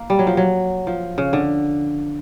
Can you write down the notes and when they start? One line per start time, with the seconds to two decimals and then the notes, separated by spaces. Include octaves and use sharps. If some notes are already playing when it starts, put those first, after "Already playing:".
Already playing: A#3
0.10 G3
0.19 F#3
0.27 F3
0.37 F#3
0.87 F3
1.18 C#3
1.33 D3